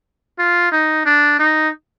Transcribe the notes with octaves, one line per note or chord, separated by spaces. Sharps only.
F4
D#4
D4
D#4